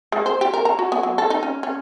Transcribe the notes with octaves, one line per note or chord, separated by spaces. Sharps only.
G#3
C5
G4
A#4
A#5
F#4
B3
F#3
A4
D#4
C#4
C#4